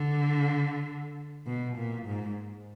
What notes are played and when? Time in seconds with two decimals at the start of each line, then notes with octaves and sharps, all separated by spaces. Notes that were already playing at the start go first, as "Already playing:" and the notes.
Already playing: D3
1.47 B2
1.77 A#2
2.07 G#2